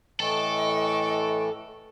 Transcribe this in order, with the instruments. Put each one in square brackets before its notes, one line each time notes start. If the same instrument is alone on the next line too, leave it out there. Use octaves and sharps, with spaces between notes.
[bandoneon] A2 E3 [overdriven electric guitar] A4 [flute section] D#5 G5 C#6